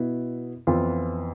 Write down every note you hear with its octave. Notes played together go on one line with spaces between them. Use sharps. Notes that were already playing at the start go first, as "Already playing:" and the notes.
Already playing: B2 B3 E4
F2 E3 B3 F4